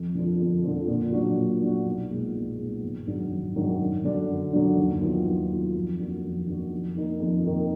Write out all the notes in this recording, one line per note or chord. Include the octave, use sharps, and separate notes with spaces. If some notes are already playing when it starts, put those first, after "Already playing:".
Already playing: F2
D3 F3
F2
D3 F3
A#2
F#3 D4 F#4
A#2
F#3 D4 F#4
B1
A#2 G#3 B3
B1
A#2 G#3 B3
G#1
G#2 D#3 F#3 D4
G#1
G#2 D#3 F#3 D4
F#2
D3 F#3 D4
F#2
D3 F#3 D4
D#2
D#3 F#3 B3 F4
D#2
D#3 F#3 B3 F4
F2
D#3 A#3 D4 F#4
F2
D#3 A#3 D4 F#4
F2
D#3 A#3 D#4
F2
D#3 A#3 D#4